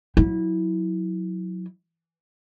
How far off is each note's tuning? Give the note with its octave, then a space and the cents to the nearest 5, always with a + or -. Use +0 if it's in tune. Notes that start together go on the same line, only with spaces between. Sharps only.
F#3 -20 E4 -20